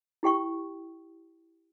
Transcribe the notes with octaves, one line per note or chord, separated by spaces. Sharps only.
E4 G4 G5 C#6